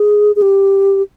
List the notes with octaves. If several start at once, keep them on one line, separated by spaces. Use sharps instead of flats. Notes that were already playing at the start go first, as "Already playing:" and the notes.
Already playing: G#4
G#4
G4